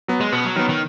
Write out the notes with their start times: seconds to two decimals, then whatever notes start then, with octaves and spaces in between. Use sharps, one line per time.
0.08 F#3 B3
0.21 G#3
0.32 B2 B3
0.44 F#3
0.56 D#3 F#3 B3
0.69 D#3